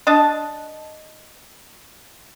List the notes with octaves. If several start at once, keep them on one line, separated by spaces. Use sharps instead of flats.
D4 D#5 A5